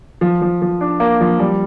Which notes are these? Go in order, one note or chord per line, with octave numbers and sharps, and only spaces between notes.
F3
F3
F3
D4
A#3
F3
G3